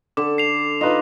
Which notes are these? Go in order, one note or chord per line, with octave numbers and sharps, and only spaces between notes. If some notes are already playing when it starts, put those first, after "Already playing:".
D3 A4 D6
C7 F7
D#4 F4 B4 D#5